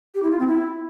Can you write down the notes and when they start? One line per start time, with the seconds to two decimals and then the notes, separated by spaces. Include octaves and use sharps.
0.14 G4
0.23 E4
0.31 F4
0.39 C4
0.47 E4